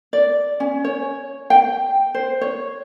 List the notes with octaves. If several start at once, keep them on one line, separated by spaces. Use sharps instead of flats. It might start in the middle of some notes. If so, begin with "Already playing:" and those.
D5
C#4
C#5
G5
C5
C#5